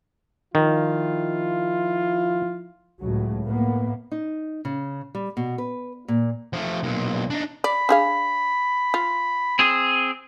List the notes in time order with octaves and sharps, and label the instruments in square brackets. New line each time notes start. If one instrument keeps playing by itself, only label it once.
[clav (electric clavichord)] D#3 [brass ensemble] F3 E4 F4
[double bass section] C#2 A2 F#3
A2 A#3 B3
[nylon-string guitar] D#4
C#3
G3
B2
B4
A#2
[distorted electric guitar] F3 A3
B1 A#2
D4 D#4
[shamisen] D5 [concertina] B5
[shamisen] D4 G#4 F5
F4
[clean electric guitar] C4 G#4